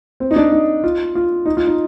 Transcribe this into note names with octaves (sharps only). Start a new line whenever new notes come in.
C4
D#4
D4
D#4
F4
F4
D#4
F4
D#4